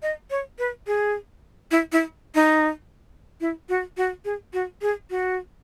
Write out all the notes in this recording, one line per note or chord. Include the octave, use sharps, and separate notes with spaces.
D#5
C#5
B4
G#4
E4
E4
D#4
E4
F#4
F#4
G#4
F#4
G#4
F#4